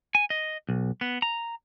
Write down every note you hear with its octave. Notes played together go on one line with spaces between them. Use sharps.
G#5
D#5
B1
B3
A#5